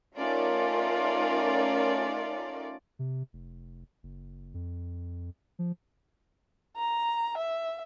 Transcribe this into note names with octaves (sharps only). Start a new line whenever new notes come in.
A3 C#4 D#4 F4 A#4 D5
C3
F1
F#1
F2
F3
A#5
E5